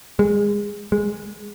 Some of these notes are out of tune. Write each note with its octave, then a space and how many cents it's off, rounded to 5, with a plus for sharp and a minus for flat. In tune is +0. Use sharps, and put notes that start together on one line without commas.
G#3 -20
G#3 -5